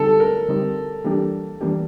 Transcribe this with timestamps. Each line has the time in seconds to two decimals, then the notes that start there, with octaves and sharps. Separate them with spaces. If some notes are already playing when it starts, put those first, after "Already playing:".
Already playing: D3 G3 C4 D#4 G4 A4
0.20 A#4
0.49 D3 G3 C4 D#4 G4
1.04 E3 G3 A#3 D4 G4
1.61 E3 G3 A#3 D4 G4